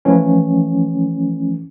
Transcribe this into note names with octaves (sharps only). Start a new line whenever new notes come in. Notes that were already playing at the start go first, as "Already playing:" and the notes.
E3 F3 A3 C#4